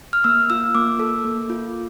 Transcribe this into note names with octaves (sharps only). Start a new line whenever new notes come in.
F6
A#3 E6
F4 E6
A#3 D6
A4
A#3
F4